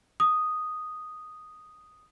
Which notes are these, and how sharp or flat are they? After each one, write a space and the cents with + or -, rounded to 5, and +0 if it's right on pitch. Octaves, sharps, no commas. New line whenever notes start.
D#6 +0